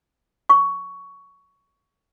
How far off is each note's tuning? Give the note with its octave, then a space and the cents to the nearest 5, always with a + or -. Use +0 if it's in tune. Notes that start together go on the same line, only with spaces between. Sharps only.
C#6 +15